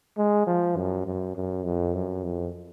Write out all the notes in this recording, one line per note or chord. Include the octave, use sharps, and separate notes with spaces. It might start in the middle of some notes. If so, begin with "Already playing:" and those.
G#3
F3
F#2
F#2
F#2
F2
F#2
F2